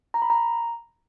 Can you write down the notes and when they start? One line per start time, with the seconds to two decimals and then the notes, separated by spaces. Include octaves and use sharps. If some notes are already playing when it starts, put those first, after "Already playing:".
0.14 A#5
0.22 B5
0.30 A#5